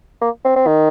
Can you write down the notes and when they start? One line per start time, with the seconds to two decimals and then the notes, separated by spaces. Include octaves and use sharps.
0.21 A#3
0.44 C4
0.56 C4
0.67 D#3